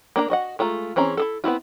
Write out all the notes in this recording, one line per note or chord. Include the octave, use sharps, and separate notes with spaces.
A#3 D4 A#4 A#5
F#4 D#5 F#5
G#3 A3 F4 A#5
E3 C4 C#4 G#4 A#5
E4 G#4 A4
B3 C4 E4 F4